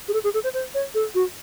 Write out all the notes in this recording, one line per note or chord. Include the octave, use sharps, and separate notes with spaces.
G#4
A4
G#4
A4
C5
C5
C#5
A4
F#4